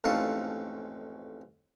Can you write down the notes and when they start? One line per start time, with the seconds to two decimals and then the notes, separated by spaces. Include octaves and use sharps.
0.04 A1 F2 G#2 F4 A4 C#6